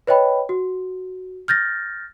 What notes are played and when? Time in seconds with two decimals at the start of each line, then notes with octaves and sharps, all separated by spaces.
0.07 B4 C#5 D#5 G5 B5
0.49 F#4
1.48 F6 G6 A6 A#6